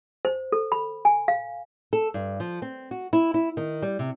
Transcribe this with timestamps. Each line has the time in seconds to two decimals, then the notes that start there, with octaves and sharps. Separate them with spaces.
0.25 C5
0.52 A4
0.72 B5
1.05 G#5
1.28 F5
1.93 A4
2.14 G2
2.40 F3
2.62 C4
2.91 F#4
3.13 E4
3.34 E4
3.57 D#3
3.82 G3
3.99 C3